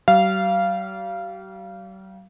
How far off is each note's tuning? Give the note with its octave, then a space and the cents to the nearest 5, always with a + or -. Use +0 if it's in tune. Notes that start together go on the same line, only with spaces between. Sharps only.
G3 -45 F5 -15